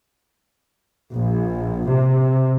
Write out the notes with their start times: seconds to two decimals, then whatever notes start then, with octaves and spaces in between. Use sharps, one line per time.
1.16 A#1
1.91 C3